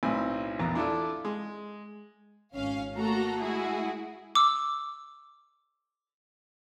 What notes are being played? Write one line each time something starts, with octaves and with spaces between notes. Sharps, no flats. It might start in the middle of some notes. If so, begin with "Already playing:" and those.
B1 A2 C4 G#5 B5
A#1 E2 B3 A#5
D4 E4 F4 A4 D5
G#3
G#1 C#4 F5
A3 A#3 F#4 A4 A#5
G#3 A3 E4 F#4 G#4
D6 E6